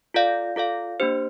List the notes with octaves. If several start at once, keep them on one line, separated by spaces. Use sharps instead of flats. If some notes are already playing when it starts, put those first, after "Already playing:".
F4 A4 D5 F5
F4 A4 D5 F5
A#3 D4 G4 C5